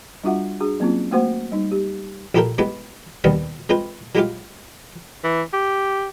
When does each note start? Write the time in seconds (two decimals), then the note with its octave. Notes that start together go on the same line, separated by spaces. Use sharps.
0.24 G3 D4 F4 F#4 E5 F#5
0.61 D4 F#4 G#4
0.80 F#3 A#3 C4 C#4 F4
1.11 A3 A#3 F#4 C5 F#5
1.52 G3 D#4
1.71 G4
2.35 A#1 E4 G4 A4 A#4 G5
2.58 G#3 B3 E4 G4 B4
3.24 D#2 B2 D#3 G3 B3
3.69 G#3 C4 F4 B4 C5
4.15 F#3 G#3 E4 F4 G4 F5
5.24 E3
5.53 G4